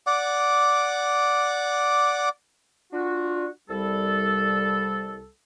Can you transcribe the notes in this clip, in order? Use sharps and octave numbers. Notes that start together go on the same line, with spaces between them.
D5 F#5 D6
D4 F4 F#4
C2 G3 A4